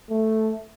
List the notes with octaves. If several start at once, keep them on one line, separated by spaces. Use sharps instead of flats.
A3